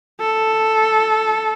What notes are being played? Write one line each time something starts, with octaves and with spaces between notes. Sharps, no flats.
A4